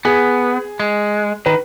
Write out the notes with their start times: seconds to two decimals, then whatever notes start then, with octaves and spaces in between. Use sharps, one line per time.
0.05 B3 G#4
0.80 G#3
1.46 D#3 B4